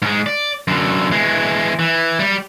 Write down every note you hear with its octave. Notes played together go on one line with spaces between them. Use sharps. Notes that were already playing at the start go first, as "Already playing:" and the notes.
G#2 G#3
D5
F#2 D3
E3 G#3
E3
G3 G4